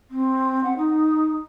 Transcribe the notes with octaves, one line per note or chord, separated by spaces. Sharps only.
C4
F#5
D#4